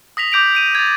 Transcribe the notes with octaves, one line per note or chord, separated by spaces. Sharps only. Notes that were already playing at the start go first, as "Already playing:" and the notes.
D#6 A#6 B6 F7
D6 G6 D7 F7
D7 D#7 F7
G#6 A6